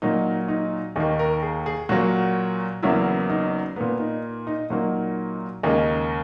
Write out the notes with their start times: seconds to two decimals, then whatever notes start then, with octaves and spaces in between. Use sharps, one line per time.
0.02 A#2 F#3 A#3 D#4
0.48 D#4
0.96 D#2 D#3 A#3 D#4
1.19 A#4
1.43 G#4
1.66 G#4
1.89 A#2 F#3 A#3 F#4
2.82 E2 C#3 F#3 A#3 E4
3.30 D#4
3.76 A#2 A#3 B3
4.00 D#4
4.47 D#4
4.70 A#2 F#3 A#3 D#4
5.63 D#2 C#3 G#3 A#3